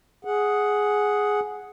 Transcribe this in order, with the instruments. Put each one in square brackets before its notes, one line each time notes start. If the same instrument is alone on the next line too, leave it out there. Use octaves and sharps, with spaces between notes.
[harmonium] G#4 F#5